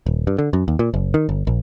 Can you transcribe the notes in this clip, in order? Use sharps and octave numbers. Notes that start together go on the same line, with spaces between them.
D#1
G2
D3
F#2
D#2
A#2
F#1
D#3
G1
A#1